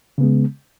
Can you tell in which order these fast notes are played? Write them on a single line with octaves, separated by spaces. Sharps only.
C#3 B3 G#3